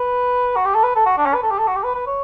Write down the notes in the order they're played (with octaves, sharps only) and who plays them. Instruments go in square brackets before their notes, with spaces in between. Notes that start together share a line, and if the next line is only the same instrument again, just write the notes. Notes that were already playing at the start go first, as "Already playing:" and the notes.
Already playing: [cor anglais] B4
F#4
G4
A4
B4
A4
F#4
D4
C#4
B4
A4
G4
A4
F#4
G4
B4
B4
C#5